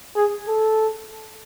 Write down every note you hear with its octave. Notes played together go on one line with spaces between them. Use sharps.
G#4
A4